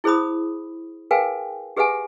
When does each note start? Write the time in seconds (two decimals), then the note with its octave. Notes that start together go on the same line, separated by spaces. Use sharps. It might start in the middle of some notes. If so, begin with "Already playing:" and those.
0.04 E4 G#4 C5 B5 D#6
1.11 G#4 A#4 B4 F5 G5 G#5
1.77 G4 G#4 B4 E5 F#5 G#5